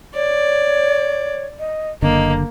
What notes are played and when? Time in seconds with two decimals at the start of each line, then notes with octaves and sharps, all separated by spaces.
0.15 C#5 D5
1.59 D#5
2.02 F#1 D3 A#3 D#5